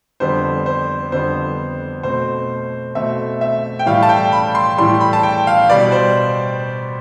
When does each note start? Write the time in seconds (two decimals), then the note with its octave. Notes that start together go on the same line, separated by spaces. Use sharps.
0.20 F2 D3 G3 B3 C5
0.66 C5
1.12 F2 D3 G3 B3 C5
2.03 B2 A3 C4 C5
2.95 B2 A3 C4 E5
3.41 E5
3.79 G5
3.86 A2 E3 G3 F5
4.03 A5
4.09 G5
4.32 B5
4.55 C6
4.78 A2 E3 G3 C6
5.01 B5
5.13 A5
5.23 G5
5.47 F5
5.70 B2 G3 B3 D5
5.92 C5